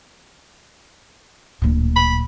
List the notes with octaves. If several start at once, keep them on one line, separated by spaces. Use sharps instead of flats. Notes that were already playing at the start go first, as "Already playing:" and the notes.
D1 A#2
B5